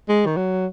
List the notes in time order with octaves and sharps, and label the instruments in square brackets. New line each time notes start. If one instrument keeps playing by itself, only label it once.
[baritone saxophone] G#3
D#3
F#3